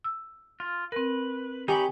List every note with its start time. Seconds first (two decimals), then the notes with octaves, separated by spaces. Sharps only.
0.04 E6
0.60 F4
0.92 C4 A#4 B4
1.68 D#4 G4 C#5 G#5 B5